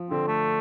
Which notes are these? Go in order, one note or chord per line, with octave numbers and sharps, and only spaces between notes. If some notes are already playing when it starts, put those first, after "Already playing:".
Already playing: F3
D3 C4
A3